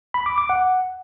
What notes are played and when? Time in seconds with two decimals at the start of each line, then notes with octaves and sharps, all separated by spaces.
0.14 B5
0.26 D6
0.38 D6
0.50 F#5